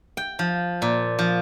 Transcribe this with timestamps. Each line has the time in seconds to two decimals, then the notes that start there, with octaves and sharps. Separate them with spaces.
0.17 G5
0.39 F3
0.82 A#2
1.19 F3